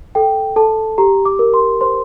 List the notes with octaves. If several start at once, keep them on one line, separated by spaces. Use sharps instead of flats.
A4 G5
A4 A5
G4 A#5
D6
A#4
C6
C5 C6